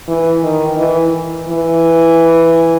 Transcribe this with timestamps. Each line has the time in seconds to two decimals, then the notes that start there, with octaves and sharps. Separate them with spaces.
0.08 E3
0.43 D#3
0.78 E3
1.49 E3